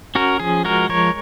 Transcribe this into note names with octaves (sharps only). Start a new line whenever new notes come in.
C#4 F#4 A#4
F3 G#4
G#3 F#4 A#4
F3 A#4 C#5